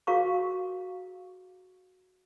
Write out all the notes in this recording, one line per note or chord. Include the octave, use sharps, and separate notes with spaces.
F#4 G#4 A#4 F5 A#5 C#6